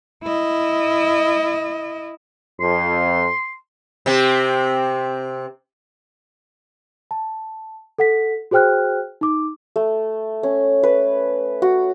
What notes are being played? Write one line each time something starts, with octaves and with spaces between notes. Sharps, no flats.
E4 D#5
F2 C6
C3 C4
A5
A4 F#5 B6
F#4 G#4 C5 G5 F6 F#6
D#4 D6
A3
C#4
B4
F#4